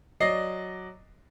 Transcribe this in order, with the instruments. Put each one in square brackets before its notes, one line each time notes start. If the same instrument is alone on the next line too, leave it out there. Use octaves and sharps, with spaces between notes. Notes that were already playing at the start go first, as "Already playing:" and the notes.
[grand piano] F#3 D5 D#5 A#6 C7